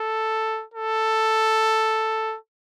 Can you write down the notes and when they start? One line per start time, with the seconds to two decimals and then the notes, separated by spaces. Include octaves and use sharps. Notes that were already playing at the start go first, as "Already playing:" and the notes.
Already playing: A4
0.74 A4